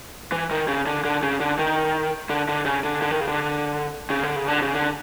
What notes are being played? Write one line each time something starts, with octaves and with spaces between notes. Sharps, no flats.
E3
D#3
C#3
D3
D3
C#3
D3
D#3
D3
D3
C#3
D3
D3
D#3
C#3
D3
C#3
D3
C#3
D3
C#3
D3